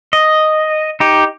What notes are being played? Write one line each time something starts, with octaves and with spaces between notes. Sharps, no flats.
D#5
D#4 G4